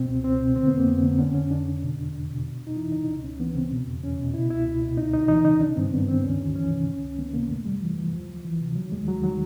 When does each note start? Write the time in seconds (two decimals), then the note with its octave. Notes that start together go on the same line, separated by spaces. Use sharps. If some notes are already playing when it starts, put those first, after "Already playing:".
Already playing: B2 C4
0.09 C#2
0.24 C#2 C4
0.40 B2
0.56 D3 C4
0.67 F2 B3
0.78 A#3
0.87 F2 B3
1.03 D3
1.19 D3 C#4
1.34 F2 C#4
1.51 F2 D4
1.66 D3
1.83 B2
1.98 E2
2.14 E2
2.30 B2
2.46 F#2
2.61 F#2
2.67 D#4
2.76 E3 E4
2.92 C#3 D#4
3.08 C#2 D4
3.24 C#2 C#4
3.40 E3 B3
3.55 C#3 C4
3.71 B2
3.87 E2
4.03 E2 C#4
4.19 B2
4.34 B2 E4
4.50 C#2 E4
4.66 C#2
4.82 B2
4.97 D2 D#4
5.13 D2 D#4
5.28 E3 D#4
5.45 C#3 D#4
5.60 D#3 D4
5.76 G2 C4
5.92 G2 B3
6.08 D#3 C4
6.24 D2 C#4
6.39 D2
6.55 E3 C#4
6.70 C3
6.87 C#2
7.02 C#2
7.18 D#3 B3
7.34 C3 A#3
7.49 F#2 A3
7.65 F#2 G3
7.81 E3 F3
7.97 C#3 E3
8.12 D2 F3
8.28 D2
8.45 E3
8.61 C3
8.75 D#3 F#3
8.92 D#2 G#3
9.08 D#2 F#3
9.23 D#3 F#3